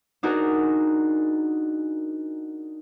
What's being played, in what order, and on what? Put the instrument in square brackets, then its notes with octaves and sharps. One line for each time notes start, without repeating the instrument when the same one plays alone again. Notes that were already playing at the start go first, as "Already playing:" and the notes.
[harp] D4 D#4 F#4 G#4 A#4